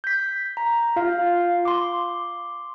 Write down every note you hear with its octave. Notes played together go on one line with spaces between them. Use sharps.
G6 B6
A#5
F4 F5
C6 D6